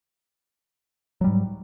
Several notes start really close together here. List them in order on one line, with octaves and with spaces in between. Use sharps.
F#3 G3 G#2